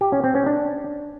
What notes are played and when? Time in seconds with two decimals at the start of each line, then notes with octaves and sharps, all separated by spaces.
0.01 G4
0.12 C#4
0.24 C4
0.35 C#4
0.46 D4